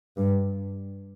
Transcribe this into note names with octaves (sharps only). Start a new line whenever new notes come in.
G2